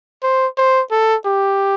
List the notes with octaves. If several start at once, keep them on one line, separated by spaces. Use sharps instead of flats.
C5
C5
A4
G4